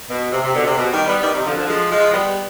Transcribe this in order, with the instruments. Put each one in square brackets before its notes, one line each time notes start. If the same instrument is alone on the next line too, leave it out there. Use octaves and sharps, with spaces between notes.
[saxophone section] B2
C3
C3
B2 D3
C3
B2
D#3 G3
G3 B3
D#3 G3
C3 D#3
D3 F3
D3 F3
F3 G#3
F3 G#3
G3 B3